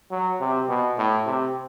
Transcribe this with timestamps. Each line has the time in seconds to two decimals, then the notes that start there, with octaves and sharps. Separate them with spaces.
0.11 F#3
0.40 C3
0.69 B2
0.98 A2
1.26 C3